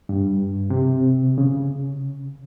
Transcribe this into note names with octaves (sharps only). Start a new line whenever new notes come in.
G2
C3
C#3